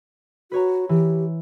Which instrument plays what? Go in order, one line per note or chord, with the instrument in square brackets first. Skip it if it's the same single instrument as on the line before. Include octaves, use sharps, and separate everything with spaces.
[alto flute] F#4 [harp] B4 C#5 A#5
[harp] E3 [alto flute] G4